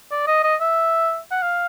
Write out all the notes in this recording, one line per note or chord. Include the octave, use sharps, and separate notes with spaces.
D5
D#5
D#5
E5
F#5
F5